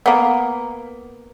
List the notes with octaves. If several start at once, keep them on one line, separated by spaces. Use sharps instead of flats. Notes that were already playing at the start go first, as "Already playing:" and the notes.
A#3 B3